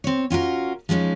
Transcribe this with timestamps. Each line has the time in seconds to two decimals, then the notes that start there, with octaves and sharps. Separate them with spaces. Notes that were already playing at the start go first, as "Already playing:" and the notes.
0.04 C4 C#5
0.30 C#4 F4 F#4 A#4
0.89 F3 G3 G#3 C#4 D#4